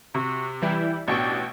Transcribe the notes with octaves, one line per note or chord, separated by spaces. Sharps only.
C3 F#4
E3 G3 E4 G5
A1 B2 D4 G5 C#6